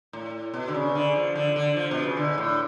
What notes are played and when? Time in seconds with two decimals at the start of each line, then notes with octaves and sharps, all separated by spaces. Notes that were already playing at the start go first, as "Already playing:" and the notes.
0.13 A2
0.54 B2
0.68 D3
0.74 C#3
0.95 D3
1.16 F3
1.35 D3
1.56 D3
1.77 F3
1.91 B2
2.03 C#3
2.17 D3
2.38 A2